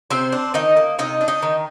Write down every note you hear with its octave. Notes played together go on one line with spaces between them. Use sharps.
C3 C4 C5
D4
D#3 D#4 D#5
A#3
C3 D#4 D#5
D4
D#4 D#5
D#3